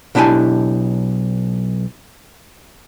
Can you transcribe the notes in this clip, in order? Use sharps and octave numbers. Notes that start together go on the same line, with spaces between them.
B1 D4 E4 G4 G#5 A5